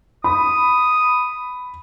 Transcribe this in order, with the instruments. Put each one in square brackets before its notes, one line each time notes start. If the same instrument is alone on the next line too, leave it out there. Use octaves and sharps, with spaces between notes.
[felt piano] B5 [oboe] D#6